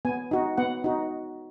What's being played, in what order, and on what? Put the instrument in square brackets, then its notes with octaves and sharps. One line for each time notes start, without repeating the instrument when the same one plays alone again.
[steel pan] B3 G#5
D#4 F#4
B3 F#5
D#4 F#4